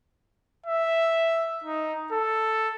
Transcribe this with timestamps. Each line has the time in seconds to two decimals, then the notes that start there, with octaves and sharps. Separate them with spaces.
0.66 E5
1.64 D#4
2.13 A4